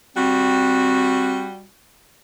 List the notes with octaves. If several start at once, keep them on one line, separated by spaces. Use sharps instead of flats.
G3 C4 F#4